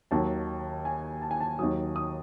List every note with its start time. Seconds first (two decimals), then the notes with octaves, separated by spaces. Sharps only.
0.11 D#2 D#3 F#3 A5
0.85 G#5
1.22 A5
1.31 G#5
1.41 A5
1.59 D#2 D#3 F#3 D#6
1.96 D#6